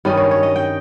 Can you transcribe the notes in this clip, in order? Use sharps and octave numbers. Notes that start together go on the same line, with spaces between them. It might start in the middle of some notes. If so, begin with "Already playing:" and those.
G2 D#3 G3 C#4 D#5
C#5
C#5
D#5
G5